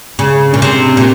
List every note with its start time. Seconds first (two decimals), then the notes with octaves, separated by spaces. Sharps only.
0.19 C#3
0.54 A#2
0.62 C3
0.97 A#2